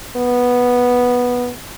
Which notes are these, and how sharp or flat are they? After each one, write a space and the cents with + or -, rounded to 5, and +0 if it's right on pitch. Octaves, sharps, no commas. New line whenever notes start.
B3 -5